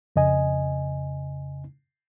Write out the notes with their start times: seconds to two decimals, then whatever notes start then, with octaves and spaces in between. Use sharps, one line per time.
0.16 F2 C#3 D#5 G#5